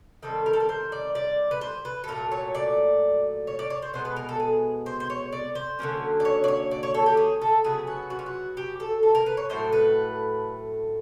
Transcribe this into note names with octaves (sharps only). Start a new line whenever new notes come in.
D#3 G3 C4 A4
A#4
A4
A#4
C5
D5
D5
B4
C5
B4
A4
A#2 F#3 A3 A#4
C#5
D5
C#5
D5
C#5
C5
B2 G#3 B3 C5
B4
A#4
A4
G#4
C5
C5
C#5
D5
C5
D3 F#3 A#3 C#4
D5
C#5
D5
C#5
D5
C#5
A4
G4
G#4
A4
C#3 F#3 B3 G#4
F#4
F#4
F4
F#4
G4
A4
A4
A#4
B4
C#5
A2 F#3 A3 C5
B4